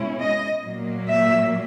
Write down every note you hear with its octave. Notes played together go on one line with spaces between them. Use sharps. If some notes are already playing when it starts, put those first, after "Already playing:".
Already playing: B2 G#3 C#4 E4
D#5
A#2 F#3 A#3
E5